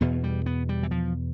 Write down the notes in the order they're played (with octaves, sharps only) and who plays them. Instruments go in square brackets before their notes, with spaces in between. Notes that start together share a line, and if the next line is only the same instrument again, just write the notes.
[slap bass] E2 B2 B3
G3
B3
G3
E3
F3